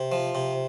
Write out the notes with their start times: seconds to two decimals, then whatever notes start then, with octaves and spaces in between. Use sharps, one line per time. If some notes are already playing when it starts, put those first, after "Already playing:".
Already playing: C3
0.12 F3
0.35 C3